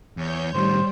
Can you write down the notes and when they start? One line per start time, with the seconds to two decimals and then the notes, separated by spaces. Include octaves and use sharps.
0.17 E2 C#5 G6
0.54 A2 D#3 G3 C5